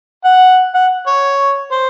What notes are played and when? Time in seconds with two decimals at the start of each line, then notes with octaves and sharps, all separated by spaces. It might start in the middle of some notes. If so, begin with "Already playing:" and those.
0.25 F#5
0.75 F#5
1.07 C#5
1.71 C5